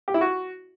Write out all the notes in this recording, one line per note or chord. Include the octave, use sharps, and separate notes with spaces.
G4
E4
F#4